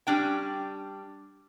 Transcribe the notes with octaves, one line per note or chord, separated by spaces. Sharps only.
G3 C#4 D4 G5